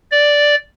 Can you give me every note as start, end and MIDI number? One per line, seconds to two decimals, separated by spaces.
0.11 0.55 74